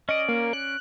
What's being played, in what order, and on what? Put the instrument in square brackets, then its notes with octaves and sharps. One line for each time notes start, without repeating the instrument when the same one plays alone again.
[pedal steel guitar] C#4 D5 [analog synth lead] D#5
[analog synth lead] A#3
F#6